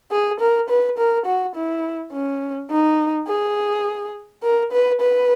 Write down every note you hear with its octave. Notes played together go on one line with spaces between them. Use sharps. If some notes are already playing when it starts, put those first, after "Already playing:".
G#4
A#4
B4
A#4
F#4
E4
C#4
D#4
G#4
A#4
B4
B4